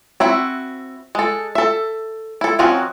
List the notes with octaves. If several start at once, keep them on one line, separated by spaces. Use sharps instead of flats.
C4 E4 F#4 E5
G#3 A4
A4 E5
E4 A4
D#3 F3 C4 C#4 F#4